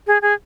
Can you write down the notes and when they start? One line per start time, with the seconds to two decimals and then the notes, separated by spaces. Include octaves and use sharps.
0.07 G#4
0.22 G#4